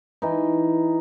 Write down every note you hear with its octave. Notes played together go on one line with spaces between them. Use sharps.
E3 D#4